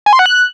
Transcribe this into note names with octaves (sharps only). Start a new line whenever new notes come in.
G#5
C6
F#5
F#6